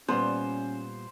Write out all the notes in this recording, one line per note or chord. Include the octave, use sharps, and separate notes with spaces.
A#2 G3 B3 C#4 C5